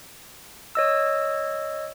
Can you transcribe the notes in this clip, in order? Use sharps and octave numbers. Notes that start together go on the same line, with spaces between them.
C#5 D#5 E6